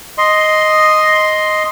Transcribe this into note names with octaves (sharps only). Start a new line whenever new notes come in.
D#5 C6